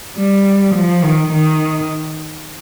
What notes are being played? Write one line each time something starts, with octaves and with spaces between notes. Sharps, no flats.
G3
F3
D#3
D#3